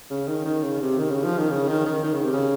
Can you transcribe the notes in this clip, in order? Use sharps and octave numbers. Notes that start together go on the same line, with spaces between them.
C#3
D#3
D#3
C#3
C3
D#3
C#3
F3
D#3
C#3
D#3
D#3
D#3
C#3
C3
C#3